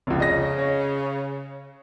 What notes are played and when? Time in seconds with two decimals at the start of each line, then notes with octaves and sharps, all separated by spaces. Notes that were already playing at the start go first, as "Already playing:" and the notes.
0.07 F1 C#2
0.20 C#3 D#5 A#6
0.59 C#5